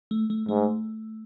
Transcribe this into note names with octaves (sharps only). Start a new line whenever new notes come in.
A3
A3
G#2 A3